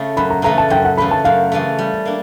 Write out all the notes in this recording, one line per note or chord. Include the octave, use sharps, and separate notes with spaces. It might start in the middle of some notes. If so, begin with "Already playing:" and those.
Already playing: C#3 A3
F#2 B5
A#5
C#3 E3 A3 A#5
A5
F#2 G5
F#5
C#3 E3 A3 B5
A5
F#2 F5
C#3 E3 A3
G3
A#3 D4